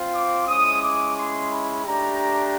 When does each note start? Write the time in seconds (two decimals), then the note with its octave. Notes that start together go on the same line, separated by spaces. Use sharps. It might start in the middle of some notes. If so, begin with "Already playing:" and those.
Already playing: C4 F4
0.15 D6
0.48 G#3 C#4 E4 D#6
0.83 D6
1.17 C6
1.51 B5
1.84 A3 D4 G4 A#5